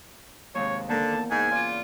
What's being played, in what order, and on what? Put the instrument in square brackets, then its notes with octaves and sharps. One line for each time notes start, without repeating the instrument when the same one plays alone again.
[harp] D#2 G#2 C3 [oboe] C#5
[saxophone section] D3 [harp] A#3 D#4 A#4 [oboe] A5
[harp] E2
[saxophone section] G#2 [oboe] G#5
[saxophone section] C#3 F4 [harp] D5